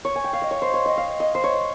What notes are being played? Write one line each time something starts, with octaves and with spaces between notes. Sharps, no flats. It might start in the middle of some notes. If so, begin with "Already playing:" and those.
C#5
G#5
G5
F5
D#5
C#5
C5
C#5
D#5
F5
D#5
C5
C#5